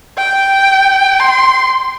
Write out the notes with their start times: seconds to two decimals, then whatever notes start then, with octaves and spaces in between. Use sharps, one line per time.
0.18 G5
1.20 C6